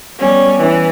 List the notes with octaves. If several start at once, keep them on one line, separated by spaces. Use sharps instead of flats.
G3 B3 C#4
E3 C#4